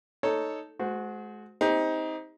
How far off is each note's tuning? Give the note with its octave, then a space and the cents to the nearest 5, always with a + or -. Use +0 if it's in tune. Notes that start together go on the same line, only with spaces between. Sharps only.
D#4 +0 A4 +0 C#5 +0
G#3 +35 F#4 -10 C5 -20
C4 +0 D#4 +20 G4 +40